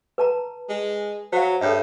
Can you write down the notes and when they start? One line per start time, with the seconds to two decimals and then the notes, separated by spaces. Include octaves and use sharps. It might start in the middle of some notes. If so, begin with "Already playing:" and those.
0.18 B4 A5 A#5
0.69 G#3
1.33 F#3 C5 F5
1.61 G2 A4 C#5 E5